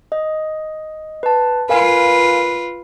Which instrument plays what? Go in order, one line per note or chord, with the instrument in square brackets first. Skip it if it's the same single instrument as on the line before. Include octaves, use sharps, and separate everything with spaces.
[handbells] D#5
B4 A5
[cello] F4 B4 [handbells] A#4 F5 G#5